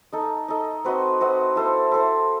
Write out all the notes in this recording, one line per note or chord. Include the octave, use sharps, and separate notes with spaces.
D#4 A4 D#5
D#4 A4 D#5
C4 F#4 B4 D#5
C4 F#4 B4 D#5
E4 A4 C5
E4 A4 C5